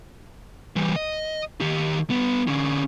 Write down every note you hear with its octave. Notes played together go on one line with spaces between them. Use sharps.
E3 G3
D#5
D#3 G4
G3 B3
D3 C#4